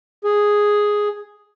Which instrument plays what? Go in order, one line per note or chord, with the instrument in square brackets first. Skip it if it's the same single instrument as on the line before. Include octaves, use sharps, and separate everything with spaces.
[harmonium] G#4